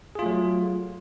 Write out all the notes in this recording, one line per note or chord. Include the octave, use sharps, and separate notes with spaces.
F#3 A3 F4 G#4